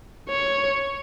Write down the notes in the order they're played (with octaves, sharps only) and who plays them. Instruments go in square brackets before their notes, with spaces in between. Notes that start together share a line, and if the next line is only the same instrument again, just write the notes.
[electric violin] C#5